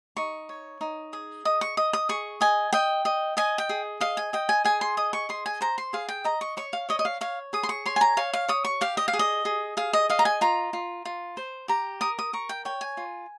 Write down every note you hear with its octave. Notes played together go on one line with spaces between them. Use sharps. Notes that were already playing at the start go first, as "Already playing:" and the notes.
D#4 C#6
C#5
D#4
G#4
D#5 D#6
C#6
D#5 D#6
D#6
G#4 C#6
D#5 G#5
D#5 G5
D#5
D#5 G#5
G5
G#4
D#5 F5
G#5
D#5 G5
G#5
G#4 G#5
C6
D#5 D#6
C#6
G#4 C6
G#5
C5 A#5
C6
G#4 F5
G5
D#5 A#5
C#6
C#5 C#6
F5
C#5 D#5
D#5
F5
C#5 F5
G#4 D#6
C6
C#6
C#5 C6
G#5
A#5
C#5 F5
F5
C#5 D#6
C#6
G4 F5
D#5
F5
G#4
D#5
G#4
G#4 F5
D#5
D#5 F5
A#5
G#5
F4 A#5
F4
F4
C5
G4 A#5
A#4 D#6
D#6
A#4 C#6
G5
C#5 G5
G#5
F4